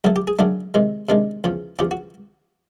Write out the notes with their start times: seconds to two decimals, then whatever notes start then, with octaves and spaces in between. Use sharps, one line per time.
0.04 F#2 C#3 F#3 A3 F#4
0.16 G4
0.27 G#4
0.39 F#2 C#3 F#3 A3 D4
0.74 C3 D#3 G#3
1.09 C3 D#3 G#3 D4
1.44 E2 C#3 F3
1.79 E2 C#3 F3 G4
1.91 F#4